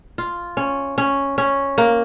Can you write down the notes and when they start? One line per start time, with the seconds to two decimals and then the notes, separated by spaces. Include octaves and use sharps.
0.18 F4
0.57 C#4
0.98 C#4
1.38 C#4
1.78 A#3